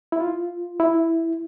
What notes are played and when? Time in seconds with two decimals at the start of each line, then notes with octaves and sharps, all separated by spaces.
0.12 E4
0.20 F4
0.80 E4